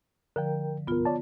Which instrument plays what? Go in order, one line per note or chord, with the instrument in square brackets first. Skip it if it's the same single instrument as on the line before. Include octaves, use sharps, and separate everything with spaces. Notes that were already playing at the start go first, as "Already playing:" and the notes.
[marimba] D3 F3 [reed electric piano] A#4 G5
[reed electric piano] C2 G2 A#4 [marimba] B3 F4
[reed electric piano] C#5 D5 A5